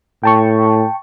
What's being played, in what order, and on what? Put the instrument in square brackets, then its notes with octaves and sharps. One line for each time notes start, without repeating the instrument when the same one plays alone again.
[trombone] A2 [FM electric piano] G5 A5 C#6